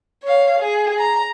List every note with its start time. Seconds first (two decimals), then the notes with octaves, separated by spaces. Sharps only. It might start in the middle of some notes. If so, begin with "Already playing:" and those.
0.23 C#5 F5
0.59 G#4
0.98 A#5